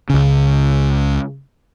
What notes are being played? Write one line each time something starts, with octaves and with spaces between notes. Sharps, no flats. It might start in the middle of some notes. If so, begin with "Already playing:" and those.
C#2 C#3